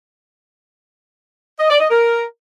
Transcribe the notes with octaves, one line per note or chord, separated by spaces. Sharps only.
D#5
D5
D#5
A#4